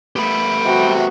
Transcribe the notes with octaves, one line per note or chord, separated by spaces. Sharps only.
A3 B3 G4 B5
C3 F#4